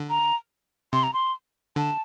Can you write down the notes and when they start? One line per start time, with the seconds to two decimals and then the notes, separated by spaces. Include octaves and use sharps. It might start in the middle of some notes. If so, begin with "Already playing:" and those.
Already playing: D3
0.10 A#5
0.93 C3 C6
1.03 A#5
1.14 C6
1.76 D3 A5